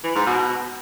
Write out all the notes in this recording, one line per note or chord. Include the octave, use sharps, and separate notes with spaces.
E3
G#2
B2